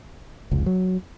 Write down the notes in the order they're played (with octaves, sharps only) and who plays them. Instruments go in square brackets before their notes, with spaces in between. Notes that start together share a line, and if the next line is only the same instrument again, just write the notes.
[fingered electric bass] F1 C#2
F#3